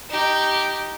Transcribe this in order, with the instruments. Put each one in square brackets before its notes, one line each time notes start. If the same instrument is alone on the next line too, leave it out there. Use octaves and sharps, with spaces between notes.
[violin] D#4 G4